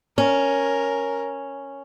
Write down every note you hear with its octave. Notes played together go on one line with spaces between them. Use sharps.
C#4 A#4